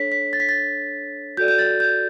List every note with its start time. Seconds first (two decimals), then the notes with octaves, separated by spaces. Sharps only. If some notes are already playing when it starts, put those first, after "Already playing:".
Already playing: D4 A4 C#5 B6
0.12 B6
0.33 A6
0.40 B6
0.49 A6
1.37 F#4 A4 D5 G6
1.48 G6
1.58 A6
1.80 G6